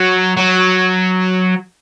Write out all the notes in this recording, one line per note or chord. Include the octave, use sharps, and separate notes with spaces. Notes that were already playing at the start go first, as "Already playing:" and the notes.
Already playing: F#3
F#3